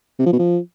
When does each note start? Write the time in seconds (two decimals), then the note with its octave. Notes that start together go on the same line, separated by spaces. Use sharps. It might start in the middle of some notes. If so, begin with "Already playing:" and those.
0.19 C3
0.26 F3
0.32 B2
0.39 F3